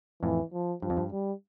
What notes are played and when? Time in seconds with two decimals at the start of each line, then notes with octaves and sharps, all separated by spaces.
0.23 F2 A2 E3
0.53 F3
0.82 G2 F3
0.90 F2
0.97 G2
1.12 G3